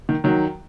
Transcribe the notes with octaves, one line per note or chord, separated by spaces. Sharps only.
D#3
D#3 F#3